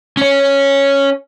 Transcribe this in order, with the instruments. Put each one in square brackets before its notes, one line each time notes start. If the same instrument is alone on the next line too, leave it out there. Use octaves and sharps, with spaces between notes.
[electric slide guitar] C#4 C#5